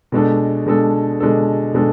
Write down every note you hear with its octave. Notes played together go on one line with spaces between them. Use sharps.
B2 G#3 D4 A4
B2 G#3 D4 A4
B2 G#3 D4 A4
B2 G#3 D4 A4